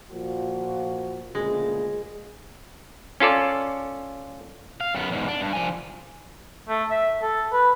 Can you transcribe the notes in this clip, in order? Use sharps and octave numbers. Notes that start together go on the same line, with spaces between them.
A#2 F3 F#4
D2 A#2 C#3 G#3
C#4 F4 A4 D5
F5
F#2 B3
E2 G#2
D4
G2
F3 G#5
A3
E5
A4
B4